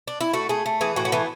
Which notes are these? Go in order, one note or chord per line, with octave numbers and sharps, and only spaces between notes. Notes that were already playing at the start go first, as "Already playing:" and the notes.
D4
E4
A3 F#4
A3 G#4
A3
E3 G#4
A2 F#4
C#4
E3 B3